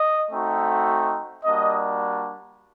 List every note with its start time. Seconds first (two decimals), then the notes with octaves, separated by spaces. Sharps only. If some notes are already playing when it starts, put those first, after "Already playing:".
Already playing: D#5
0.32 A3 C4 D#4 F#4
1.44 G3 A#3 D4 F#4 D#5